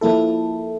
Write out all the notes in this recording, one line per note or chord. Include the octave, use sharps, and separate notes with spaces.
F3 A#3 E4 A4